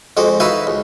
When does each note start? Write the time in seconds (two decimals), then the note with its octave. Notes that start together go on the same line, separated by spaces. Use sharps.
0.17 F2 G#3 F#4 D6
0.40 D#4 E4 F#4 B4 F5
0.67 C#2